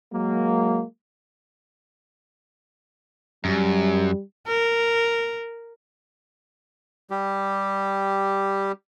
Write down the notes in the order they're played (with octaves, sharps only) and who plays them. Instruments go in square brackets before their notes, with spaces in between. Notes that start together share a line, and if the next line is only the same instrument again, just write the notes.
[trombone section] F#3 G#3 A#3
[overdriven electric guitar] F#2 [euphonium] G3
[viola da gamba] A#4
[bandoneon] G3 G4